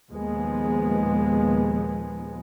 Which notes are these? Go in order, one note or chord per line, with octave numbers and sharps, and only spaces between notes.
D#2 A#2 F3 G#3 B3